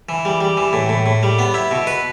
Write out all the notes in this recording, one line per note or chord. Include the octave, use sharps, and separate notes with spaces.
E3
G3
G3
E3
A2
A2
A2
G3
B3
E4
B2
B4